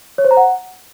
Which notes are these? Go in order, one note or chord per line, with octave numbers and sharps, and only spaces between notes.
C#5
C5
A#5
F#5